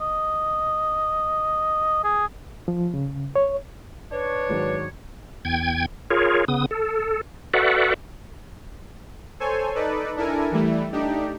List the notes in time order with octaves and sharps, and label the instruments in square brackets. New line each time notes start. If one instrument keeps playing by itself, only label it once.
[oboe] D#5
G#4
[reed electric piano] F3
C#3
C#5
[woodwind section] D4 C#5 [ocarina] B4
[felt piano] G#2 D#3 F#3
[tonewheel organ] E2 G5 G#6
F4 G#4 A#4 C#5
C#3 B3 D#6
A4
F#4 A4 B4 D5 E5 F#5
[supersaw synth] A4 C5 C#5 G#5
D#4 A4 B4 D5
D4 E4 A4 A#4 G#5
E3 G3 A3 E4
A3 D4 D#4 G4